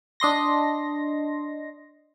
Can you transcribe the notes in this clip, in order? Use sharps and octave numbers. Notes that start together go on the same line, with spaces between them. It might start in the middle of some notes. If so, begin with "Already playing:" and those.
D4 D#5 C6 A#6